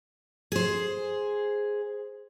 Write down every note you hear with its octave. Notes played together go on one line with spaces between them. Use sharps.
G#4 C5